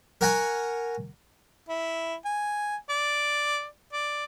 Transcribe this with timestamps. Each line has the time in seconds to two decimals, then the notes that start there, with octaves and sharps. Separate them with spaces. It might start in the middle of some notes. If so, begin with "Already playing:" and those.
0.21 A#4 C#5 F#5 G#5 A#5
1.69 E4
2.25 G#5
2.89 D5
3.93 D5